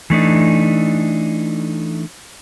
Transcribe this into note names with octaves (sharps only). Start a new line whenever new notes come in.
E3 A3 D4 D#4